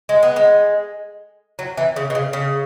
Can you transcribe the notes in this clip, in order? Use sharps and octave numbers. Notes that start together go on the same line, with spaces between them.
G#3
B3
G#3
F#3
E3
C#3
B2
C#3
C#3